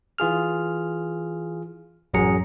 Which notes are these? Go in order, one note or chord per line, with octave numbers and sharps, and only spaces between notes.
E3 F4 G#4 F6
A1 F#2 F#3 G#4 A#5 C#7